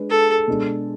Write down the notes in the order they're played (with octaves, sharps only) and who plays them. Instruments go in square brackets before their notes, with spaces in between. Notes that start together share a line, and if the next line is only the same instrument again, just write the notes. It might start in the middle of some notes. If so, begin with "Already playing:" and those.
Already playing: [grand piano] G#3 D4 G#4 B4
[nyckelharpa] A4
[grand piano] B2 G#3 D4